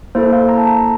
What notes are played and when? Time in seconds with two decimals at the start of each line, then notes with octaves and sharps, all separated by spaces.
0.15 A#3 E4 A4 C5
0.32 F5
0.49 A#5
0.57 A5
0.66 A#5